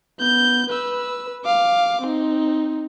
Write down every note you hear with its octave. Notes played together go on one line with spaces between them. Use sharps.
B3 G6
B4 E6
F5 D6
C4 D#4